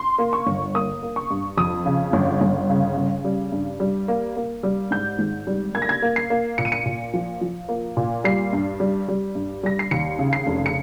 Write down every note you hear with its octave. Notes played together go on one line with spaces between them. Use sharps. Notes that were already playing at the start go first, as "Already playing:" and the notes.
Already playing: C6
A#3
C#6
G1
A#3 D#6
A#3
C#6
G2
F2 D#6
C#3
G1
G1
C#3
C#3
G3
G2
G3
A#3
A#3
G3
G#2 G6
G#1
G3
A#3 G#6
A#6
G#6
A#3
C7
A#3
A#2 C#7
D#7
C#7
A#2
F3
F3
A#3
A#2
G3 C7
G2
G3
G3
G2
G3 A#6
C7
D#2 C#7
C#3
C7
F1
C#7